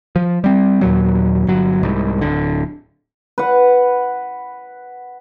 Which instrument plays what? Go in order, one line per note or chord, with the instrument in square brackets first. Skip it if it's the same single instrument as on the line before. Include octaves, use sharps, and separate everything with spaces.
[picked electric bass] F3
G3 C4
D#2 A#2 F#3
G1 F#3
C2 G#2
D1 D3
[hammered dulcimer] B4 F#5